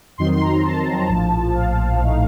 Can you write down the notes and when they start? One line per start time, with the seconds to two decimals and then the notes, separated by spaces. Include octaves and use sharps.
0.18 F2 D#3 F#3 C4 D#4 C6
0.31 C6
0.41 A#5
0.64 A5
1.09 A#1 A2 F3
1.54 F5
1.99 A#1 A2 A3 D#4